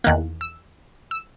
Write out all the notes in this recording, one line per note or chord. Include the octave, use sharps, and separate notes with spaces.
E2 D#3 A#3 F#6
E6
E6